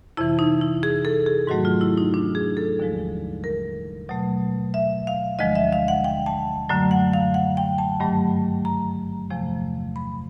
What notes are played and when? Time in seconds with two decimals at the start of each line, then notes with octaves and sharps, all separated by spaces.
0.17 F2 C3 E3 E4
0.39 D#4
0.61 E4
0.83 G#4
1.05 A4
1.26 G#4
1.47 G#2 D#3 F#3 A3 F#4
1.65 F4
1.81 E4
1.98 D#4
2.14 D4
2.35 G#4
2.57 A4
2.79 D#2 D3 F3 G#3
3.44 A#4
4.09 B2 F#3 A3
4.74 E5
5.07 F5
5.39 D2 D3 F3 G#3 D#5
5.55 E5
5.72 F5
5.88 F#5
6.04 G5
6.26 A5
6.69 F#2 D3 F#3 A3
6.91 F#5
7.13 F5
7.34 F#5
7.57 G5
7.78 A5
8.00 G2 D#3 F#3 A3
8.65 A#5
9.30 E2 C3 F3 A3
9.96 B5